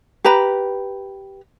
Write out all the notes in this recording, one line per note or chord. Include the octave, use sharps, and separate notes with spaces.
G4 B4 A#5 B5